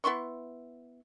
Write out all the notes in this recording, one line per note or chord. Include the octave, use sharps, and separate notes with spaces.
B3 E4 C6 C#6